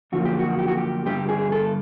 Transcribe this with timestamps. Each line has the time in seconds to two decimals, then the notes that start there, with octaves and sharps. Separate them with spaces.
0.12 F#2 D3 F3 A#3 F#4
0.26 G4
0.39 F#4
0.59 G4
0.68 F#4
0.77 G4
1.05 G2 D3 G3 G4
1.29 G#4
1.52 A4